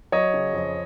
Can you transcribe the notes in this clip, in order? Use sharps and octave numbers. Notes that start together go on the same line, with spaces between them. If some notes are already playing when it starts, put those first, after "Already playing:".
F#3 C#5 D#5
C#3
F2